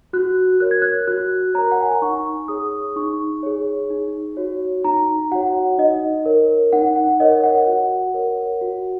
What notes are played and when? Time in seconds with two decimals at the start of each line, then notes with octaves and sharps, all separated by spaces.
0.13 F#4 F#6
0.60 A#4 C#5 F#6
0.71 G#6
0.82 F#6
1.07 F#4 F#6
1.54 A#4 C#5 A#5
1.72 F#5
1.82 G#5
1.91 A#5
2.02 D#4 C#6
2.48 G#4 C#5 D#6
2.96 D#4 C#6
3.43 G#4 C#5
3.90 D#4
4.37 F#4 C#5
4.84 D#4 A#5
5.32 F#4 C#5 F#5
5.78 D#4 D#5
6.26 A#4 C#5
6.73 D#4 F#5
6.96 F#5
7.20 A#4 C#5 D#5
7.43 F#5
7.67 F#4
8.14 A#4 C#5
8.61 F#4